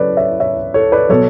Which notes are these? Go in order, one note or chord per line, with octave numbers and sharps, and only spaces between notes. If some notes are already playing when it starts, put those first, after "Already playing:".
Already playing: C#3 F#3 A4 B4 C#5 D5
C#5 E5
C#5 E5
A4 C#5
B4 D5
B2 F#3 A4 C#5